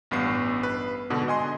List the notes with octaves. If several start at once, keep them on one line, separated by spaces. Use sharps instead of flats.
A1 G2 B3 C7
B4
G#2 B2 D3
D#5 G#5 C6